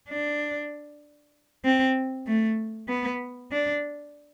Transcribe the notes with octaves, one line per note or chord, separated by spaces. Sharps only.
D4
C4
A3
B3
D4